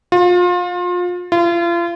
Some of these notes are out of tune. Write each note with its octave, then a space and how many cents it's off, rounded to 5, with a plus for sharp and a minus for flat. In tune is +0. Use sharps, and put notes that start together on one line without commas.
F4 +30
F4 -35